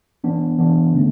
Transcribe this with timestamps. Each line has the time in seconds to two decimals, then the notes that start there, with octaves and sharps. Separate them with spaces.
0.24 E3 B3 D4
0.59 E3 B3 D4
0.94 D3 A3 C#4